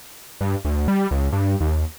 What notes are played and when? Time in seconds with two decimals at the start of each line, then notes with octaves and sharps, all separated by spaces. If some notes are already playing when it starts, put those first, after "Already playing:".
0.41 G2
0.65 D2
0.88 G3
1.11 C#2
1.32 G2
1.60 D#2